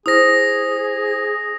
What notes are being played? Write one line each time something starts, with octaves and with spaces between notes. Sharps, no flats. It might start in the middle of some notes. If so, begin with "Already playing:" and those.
E4 G#4 C5 D#6 A#6